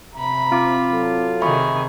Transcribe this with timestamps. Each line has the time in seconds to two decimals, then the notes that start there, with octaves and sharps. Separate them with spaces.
0.15 C3 E5 A#5 B5
0.52 C4 F4 D6
0.92 F#3 A4
1.42 C3 D#3 G#4 E5 B5 C#6